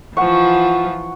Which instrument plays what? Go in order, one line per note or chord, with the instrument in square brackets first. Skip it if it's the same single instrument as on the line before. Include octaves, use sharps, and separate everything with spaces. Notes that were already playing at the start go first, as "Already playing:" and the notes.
[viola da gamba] E3 F3 F4 [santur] F#5 C#6